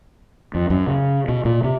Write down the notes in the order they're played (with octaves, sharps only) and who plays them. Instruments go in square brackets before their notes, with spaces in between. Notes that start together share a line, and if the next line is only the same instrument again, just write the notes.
[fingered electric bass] F2
F#2
C#3
B2
A#2
C3